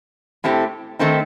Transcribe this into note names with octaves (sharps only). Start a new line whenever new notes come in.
A2 A3 C4 G4
D#3 A3 C4 D#4